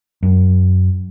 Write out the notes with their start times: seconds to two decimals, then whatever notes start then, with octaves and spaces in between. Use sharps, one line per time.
0.23 F#2